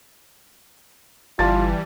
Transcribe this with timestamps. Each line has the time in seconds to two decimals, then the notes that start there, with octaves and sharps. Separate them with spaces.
1.39 G1 E3 G3 F4 A5 A6